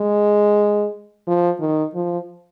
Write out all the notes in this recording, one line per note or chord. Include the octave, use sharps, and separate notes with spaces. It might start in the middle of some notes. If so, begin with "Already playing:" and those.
Already playing: G#3
F3
D#3
F3